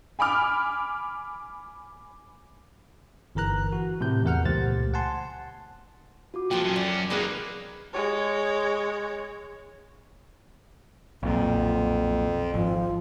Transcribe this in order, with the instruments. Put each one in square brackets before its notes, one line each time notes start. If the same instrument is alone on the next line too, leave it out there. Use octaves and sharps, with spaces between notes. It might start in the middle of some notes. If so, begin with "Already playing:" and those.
[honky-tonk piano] G#5 B5 D6 F6
[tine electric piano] G1 E3 A#4 A#5 F#6
F#4
A2 C3 E3 G6
E2 A#4 F#5 F6
C#2 A#2 A3 G4 C5 A6
F#5 G#5 A5 C6
[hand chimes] F4 F#4 D6
[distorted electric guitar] A#2 F3 [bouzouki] A3 B4 [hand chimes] G5
[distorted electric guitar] F#2 C#4
[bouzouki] D4
[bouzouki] G#3 B3 B4 [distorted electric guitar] A#3 D#4 [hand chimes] B5 D6 F#6
[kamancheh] G#3 C#5
[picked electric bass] B1 A#2 [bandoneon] F2
[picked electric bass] G#1 [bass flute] F3